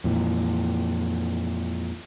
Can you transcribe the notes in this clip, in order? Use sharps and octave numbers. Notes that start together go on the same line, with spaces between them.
F2 A#2 E3